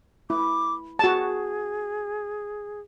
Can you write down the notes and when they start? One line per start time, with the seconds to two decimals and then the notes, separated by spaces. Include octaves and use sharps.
0.30 E4 D6
0.99 F#4 G#4 A5